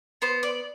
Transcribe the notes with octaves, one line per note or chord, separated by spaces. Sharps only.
B3 C5
D5